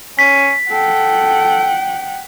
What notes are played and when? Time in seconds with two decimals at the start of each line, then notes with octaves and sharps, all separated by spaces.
0.19 C#4 B6
0.71 A4 F#5 G5